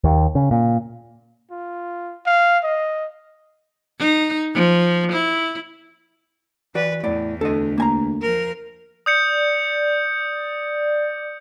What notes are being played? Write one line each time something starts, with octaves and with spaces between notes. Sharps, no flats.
D#2
C#3
A#2
F4
F5
D#5
D#4
F3
E4
E3 F#4 B4 D5
E2 A2 D5
D2 A4 D#5
A#3 G#5 A#5
F3 A#4
D5 D#6 G6 C#7